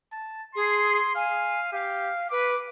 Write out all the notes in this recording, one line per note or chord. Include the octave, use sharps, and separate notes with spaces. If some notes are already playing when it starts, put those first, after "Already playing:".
A5
G#4 C6
F5 G#5
G4 F5
B4 D6